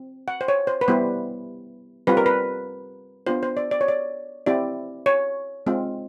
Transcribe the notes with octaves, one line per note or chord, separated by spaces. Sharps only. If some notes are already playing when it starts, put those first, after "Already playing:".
Already playing: C4
F#5
C5
C#5
C5
B4
G3 B3 E4 G4 C5
G3 C4 F4 B4
A#4
B4
B3 D4 F4 C5
C5
D5
D5
C#5
D5
C4 E4 G4 D5
C#5
G#3 C4 F4